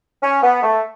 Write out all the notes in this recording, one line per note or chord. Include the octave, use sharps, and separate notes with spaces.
C#4
B3
A3